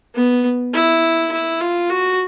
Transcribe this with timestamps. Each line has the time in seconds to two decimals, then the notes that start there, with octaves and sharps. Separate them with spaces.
0.15 B3
0.74 E4
1.32 E4
1.61 F4
1.90 F#4